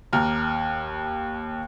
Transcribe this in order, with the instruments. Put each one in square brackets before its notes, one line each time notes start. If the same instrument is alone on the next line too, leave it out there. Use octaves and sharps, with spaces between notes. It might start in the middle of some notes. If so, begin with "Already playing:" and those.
[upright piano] D#2 A#5 F6